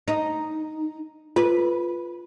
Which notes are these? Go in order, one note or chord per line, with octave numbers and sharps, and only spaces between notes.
D#4
F4 B4